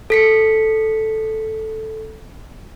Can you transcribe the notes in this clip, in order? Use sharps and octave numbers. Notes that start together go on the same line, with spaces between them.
A4 B6 C#7